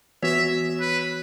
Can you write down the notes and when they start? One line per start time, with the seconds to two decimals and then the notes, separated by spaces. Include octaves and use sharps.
0.23 E3 B3 F#4 C#5 E5
0.80 B4